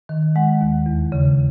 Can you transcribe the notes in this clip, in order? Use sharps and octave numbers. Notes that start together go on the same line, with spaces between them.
D#3
G#3 F#5
D#2
E2
C#3